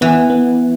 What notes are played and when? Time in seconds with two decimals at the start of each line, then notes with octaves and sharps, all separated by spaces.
0.01 E3 B3
0.30 B3